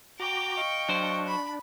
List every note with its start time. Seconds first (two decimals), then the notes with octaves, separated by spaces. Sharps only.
0.20 F#4 G5 A#5 D6
0.57 D#5 F5 C#6
0.89 F#3 D4 C5
1.27 B5